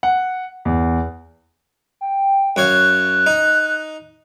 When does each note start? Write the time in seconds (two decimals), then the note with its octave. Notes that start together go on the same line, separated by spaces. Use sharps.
0.03 F#5
0.65 E2
2.01 G5
2.56 F#2 C#5 F5 F#6
3.26 D#4